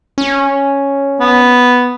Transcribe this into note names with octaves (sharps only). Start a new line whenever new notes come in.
C#4
B3